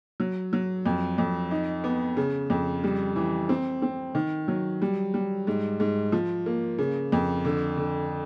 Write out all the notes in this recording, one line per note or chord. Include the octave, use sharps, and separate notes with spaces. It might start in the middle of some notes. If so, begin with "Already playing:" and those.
F#3
F#3
F2
F2
D#4
B3
C#3
F2
G3
E3
C4
C4
D#3
F#3
G3
G3
G#2
G#2
F3
A#3
C#3
F2
D3
D3